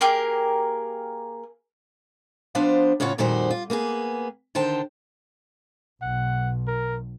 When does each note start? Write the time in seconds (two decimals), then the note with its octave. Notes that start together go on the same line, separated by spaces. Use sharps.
0.01 A#3 G4 G#4 A#4
2.55 F3 B3 D4 C5 F5
3.00 A2 C#3 F4 C#5 F#5
3.18 F2 A#2 D#3 G3 F#4 C5
3.51 F4
3.70 A#3 B3 E4 G#4
4.55 D3 D#3 C5 G5 A5
6.02 B1 F#5
6.67 A#4